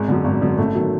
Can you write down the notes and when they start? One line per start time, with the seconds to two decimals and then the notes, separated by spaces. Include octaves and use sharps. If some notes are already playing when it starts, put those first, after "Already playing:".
Already playing: G#1 G#3
0.08 F#2 D3
0.24 G#1
0.41 F#2 D3
0.58 A1 A3
0.75 D#3 F#3